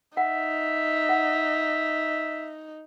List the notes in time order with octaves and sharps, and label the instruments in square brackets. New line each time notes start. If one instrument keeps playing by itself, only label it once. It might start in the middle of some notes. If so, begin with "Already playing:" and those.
[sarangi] D#4 [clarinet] E5 [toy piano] F#5
[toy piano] F#5